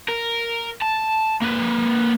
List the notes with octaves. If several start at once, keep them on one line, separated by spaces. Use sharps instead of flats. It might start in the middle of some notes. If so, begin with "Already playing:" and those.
A#4
A5
A#3 B4